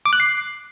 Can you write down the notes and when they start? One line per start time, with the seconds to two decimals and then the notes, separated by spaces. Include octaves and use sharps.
0.06 D6
0.13 F#6
0.20 C7